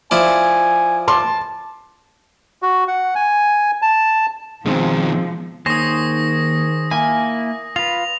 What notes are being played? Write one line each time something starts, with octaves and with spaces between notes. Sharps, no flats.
F3 E4 D5 G#5
A5 C6 D6
F#4
F#5
G#5
A5
B2 D#3 F3 G#3 C4
D#2 D#3 G#4 C5 C#5 D#6 A#6
A#3 E4 G#5
F4 B4 F7